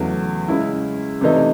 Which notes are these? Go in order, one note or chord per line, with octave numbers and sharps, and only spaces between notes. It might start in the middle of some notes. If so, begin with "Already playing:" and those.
Already playing: E2 C#3 F#3 A3
C#3 G#3 C#4 E4
C3 E3 A3 D#4